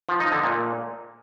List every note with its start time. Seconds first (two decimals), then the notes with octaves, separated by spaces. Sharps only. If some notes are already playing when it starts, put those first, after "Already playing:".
0.09 F3
0.20 D#4
0.32 D3
0.44 A#2